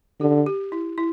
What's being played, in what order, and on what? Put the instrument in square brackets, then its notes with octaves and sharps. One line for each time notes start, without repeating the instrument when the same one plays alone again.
[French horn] D3 [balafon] G4
[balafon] G4
E4
E4